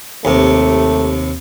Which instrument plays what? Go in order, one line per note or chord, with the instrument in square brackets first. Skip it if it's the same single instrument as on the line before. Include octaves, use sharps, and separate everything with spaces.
[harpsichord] D#2 C3 [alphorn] A3